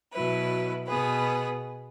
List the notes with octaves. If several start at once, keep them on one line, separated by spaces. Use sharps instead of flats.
B2 F#3 E4 B4
B2 B3 G#4 B4